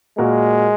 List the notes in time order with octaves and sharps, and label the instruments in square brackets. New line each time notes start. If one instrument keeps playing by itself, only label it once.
[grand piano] A#2 A#3 F#4 A#4 [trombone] G#3